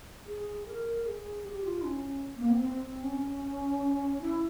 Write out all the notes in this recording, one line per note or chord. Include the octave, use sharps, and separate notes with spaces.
G#4
A#4
G#4
G4
F4
C#4
A#3
C4
C4
C#4
E4